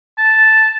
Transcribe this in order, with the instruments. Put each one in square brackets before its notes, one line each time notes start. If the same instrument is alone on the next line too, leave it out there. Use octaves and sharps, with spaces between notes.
[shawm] A5